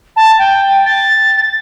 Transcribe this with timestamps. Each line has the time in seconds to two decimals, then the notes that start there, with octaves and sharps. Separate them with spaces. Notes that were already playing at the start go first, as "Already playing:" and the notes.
0.16 A5
0.38 G5
0.85 A6